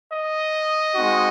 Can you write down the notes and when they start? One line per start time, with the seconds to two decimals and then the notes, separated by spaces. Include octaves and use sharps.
0.11 D#5
0.95 G#3 C4 D#4 F#4